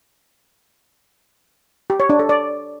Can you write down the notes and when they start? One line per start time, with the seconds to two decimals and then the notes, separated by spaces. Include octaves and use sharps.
1.90 G4
2.00 C#5
2.10 D4
2.19 A4
2.29 D5